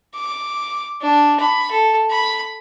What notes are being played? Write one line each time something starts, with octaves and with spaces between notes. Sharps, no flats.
D6
D4
B5
A4
B5